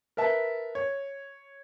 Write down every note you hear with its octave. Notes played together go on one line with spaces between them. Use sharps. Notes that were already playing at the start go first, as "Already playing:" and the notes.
A#4 B4 E5 A5
C#5